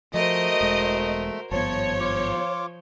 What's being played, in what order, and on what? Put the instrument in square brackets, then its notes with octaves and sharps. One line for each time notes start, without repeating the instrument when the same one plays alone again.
[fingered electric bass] F3 [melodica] A3 [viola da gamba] F#4 A#4 C5 [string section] D#5
[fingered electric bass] E1 G#3
[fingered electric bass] G#1 G2 B3 [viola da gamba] F3 [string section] C#5 [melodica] A5
[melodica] F4 D6